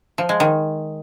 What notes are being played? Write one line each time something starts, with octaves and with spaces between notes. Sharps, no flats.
F3
G#3
D#3